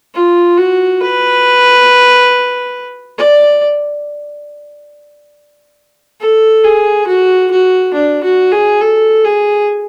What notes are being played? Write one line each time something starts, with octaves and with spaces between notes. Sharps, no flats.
F4
F#4
B4
D5
A4
G#4
F#4
F#4
D4
F#4
G#4
A4
G#4